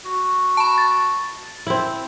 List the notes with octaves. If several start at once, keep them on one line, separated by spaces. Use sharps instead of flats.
F#4
A5 B5
A6
C4 E4